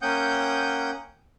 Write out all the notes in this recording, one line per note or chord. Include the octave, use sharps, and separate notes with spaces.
A#3 C#4 F#5 G5 D#6 G6